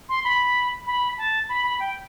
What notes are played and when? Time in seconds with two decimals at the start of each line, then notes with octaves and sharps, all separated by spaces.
0.09 C6
0.24 B5
0.86 B5
1.17 A5
1.48 B5
1.63 B5
1.79 G5